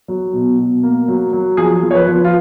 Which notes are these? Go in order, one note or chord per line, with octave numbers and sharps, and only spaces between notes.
F#3
B2
B2
A#3
F#3
F#3
F3 G#4
F3
C#5
B4
F3
F4